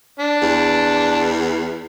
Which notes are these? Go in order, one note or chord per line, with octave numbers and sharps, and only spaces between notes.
D4
E2